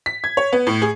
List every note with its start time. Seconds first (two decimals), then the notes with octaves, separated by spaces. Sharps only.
0.06 B6
0.24 G#6
0.37 C#5
0.53 B3
0.67 A2
0.82 G#4